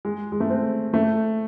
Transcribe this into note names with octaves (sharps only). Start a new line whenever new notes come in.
G#3
G#3
A3
C4
A3